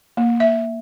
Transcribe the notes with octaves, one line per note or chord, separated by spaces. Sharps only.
A#3
E5